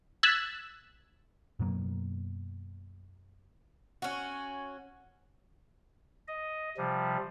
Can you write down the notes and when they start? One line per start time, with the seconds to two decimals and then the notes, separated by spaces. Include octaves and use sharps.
0.23 E6 F#6 G#6 A6 B6
1.60 F#2 B2 F#3 A#3
4.02 C#4 F#4
6.28 D#5
6.77 C3 F3 G3